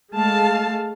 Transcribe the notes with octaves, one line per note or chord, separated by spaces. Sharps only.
G#3 A3 F5 A5